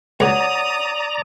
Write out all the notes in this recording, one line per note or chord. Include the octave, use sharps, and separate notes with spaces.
C#2 C#5 D5 F#5 A#5 D#6